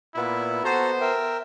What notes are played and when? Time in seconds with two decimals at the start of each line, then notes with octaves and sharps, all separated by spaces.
0.15 A#2 B3 E4
0.64 B3 F#4 A4 C5 A#5
1.01 A#4 E5 G5